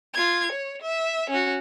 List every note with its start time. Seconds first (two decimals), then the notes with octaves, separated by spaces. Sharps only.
0.14 F4 G#6
0.52 C#5
0.82 E5
1.30 C#4 F#4